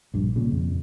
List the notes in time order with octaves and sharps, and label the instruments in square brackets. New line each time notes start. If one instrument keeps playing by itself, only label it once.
[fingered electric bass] A#1 G2
A#2 C#3
F2